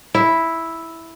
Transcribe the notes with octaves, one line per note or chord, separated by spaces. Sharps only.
E4